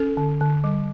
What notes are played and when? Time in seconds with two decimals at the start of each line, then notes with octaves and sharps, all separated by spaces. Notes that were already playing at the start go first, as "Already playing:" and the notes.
Already playing: C#4 A4
0.17 D3
0.41 D3
0.64 G3